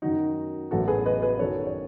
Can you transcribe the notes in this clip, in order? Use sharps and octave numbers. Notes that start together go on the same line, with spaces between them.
F#2 D#3 F#3 D#4 F#4
A1 A2 F#3 B3 F#4 A4
G#4 B4
B4 D#5
G#4 B4
F#2 D#3 F#3 A4 C#5
C#5